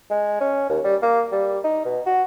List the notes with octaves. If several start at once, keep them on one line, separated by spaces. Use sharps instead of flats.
G#3
C#4
D#2
G3
A#3
G3
D#4
B2
F#4